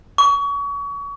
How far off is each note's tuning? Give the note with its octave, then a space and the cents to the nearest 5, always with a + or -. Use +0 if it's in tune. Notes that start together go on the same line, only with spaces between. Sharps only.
C#6 +35